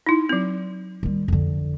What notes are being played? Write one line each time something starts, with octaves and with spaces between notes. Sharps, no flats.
D#4 E4
F#3 C4
D#3 G3
F2 D3